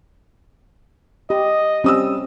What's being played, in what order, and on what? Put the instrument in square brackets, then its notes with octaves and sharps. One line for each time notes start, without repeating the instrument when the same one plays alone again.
[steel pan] G4 [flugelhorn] D#5
[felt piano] G3 D#6 E6 [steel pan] C4 C#4